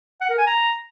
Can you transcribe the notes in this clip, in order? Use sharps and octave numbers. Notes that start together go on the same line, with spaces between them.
F#5
A#4
G#5
A#5